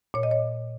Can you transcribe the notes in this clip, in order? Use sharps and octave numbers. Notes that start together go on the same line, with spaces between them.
A#2 C#5
D#5
C#5